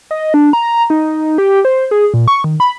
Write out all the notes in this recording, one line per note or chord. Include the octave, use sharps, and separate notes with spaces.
D#5
D4
A#5
D#4
G4
C5
G#4
A#2
C#6
D#3
B5